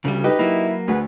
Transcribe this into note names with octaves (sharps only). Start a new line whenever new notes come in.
D2 C#3 G3
D#4 G4 B4
F#3 A#3 E4
D2 F#4 G#4 B4